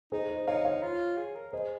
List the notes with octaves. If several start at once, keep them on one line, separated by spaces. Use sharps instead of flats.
D#4 G#4 C5
C5 D#5
D#4 C#5 F5
C#5 F5
F4
G#4
A#4
G#4 C5 D#5